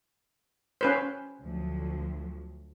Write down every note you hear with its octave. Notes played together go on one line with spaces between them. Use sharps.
C#4 B4 C5
D2 F3 F#3